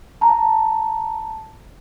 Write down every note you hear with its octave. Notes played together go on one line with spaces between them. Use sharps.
A5 A#5